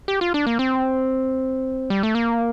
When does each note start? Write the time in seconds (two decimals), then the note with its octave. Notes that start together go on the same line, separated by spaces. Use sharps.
0.08 G4
0.21 F4
0.34 D4
0.47 A#3
0.59 C4
1.90 G3
2.03 A3
2.15 A#3